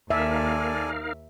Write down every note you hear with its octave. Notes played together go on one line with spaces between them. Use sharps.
D#2 D#4 A4 A#4 D5 E5 F5 G#5